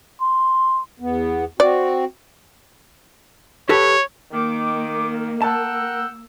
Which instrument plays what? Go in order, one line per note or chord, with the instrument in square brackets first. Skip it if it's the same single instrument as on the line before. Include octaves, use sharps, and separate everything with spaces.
[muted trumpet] C6
[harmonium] E2 B3
[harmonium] C4 F#4 [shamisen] D5
[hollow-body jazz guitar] G4 A4 B4 [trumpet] C#5
[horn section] D#3 [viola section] A#3 [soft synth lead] D6
[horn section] A#4 F#5 G5 [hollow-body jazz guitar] A5 [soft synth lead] E6